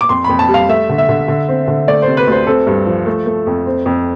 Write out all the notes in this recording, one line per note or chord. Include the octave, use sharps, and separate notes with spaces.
D6
F2 C6
F2 B5
A5
G3
F5
A3 E5
D3
E5
D3
D3
C4
D3
A3 D5
C5
C3
B4
D2 C5
C4 A4
G2
F3
A3
A3
F2
C4
F2